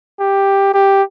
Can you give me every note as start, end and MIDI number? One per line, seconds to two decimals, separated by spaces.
0.20 0.72 67
0.74 1.03 67